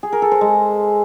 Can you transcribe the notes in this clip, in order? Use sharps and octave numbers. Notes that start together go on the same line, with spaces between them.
G#4
A#4
A4
C5
G#3